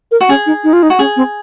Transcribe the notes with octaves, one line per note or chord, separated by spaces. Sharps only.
A#4
F#4
C#4 G#4
D#4
D#4
F4
D#4
F#4
C#4 G#4
C4